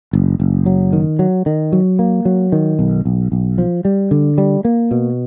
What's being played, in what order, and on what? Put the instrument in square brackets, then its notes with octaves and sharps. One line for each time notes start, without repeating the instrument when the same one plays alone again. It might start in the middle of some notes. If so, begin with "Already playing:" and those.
[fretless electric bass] F#1
F#1
F#3
D#3
F#3
D#3
F#3
A#3
F#3
D#3
B1
B1
B1
F3
G3
D3
G3
A#3
B2